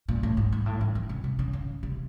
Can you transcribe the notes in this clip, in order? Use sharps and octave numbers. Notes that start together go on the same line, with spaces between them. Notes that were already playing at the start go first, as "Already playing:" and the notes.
A#2
A2
G#2
G#2
A2
D#3
E3
C3
C3
C#3
C#3
C3